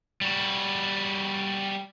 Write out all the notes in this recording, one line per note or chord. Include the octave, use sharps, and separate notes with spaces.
G3 F#4